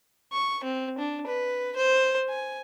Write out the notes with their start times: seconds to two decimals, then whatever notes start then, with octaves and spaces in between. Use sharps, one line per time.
0.32 C#6
0.64 C4
0.98 D4
1.27 B4
1.76 C5
2.29 G#5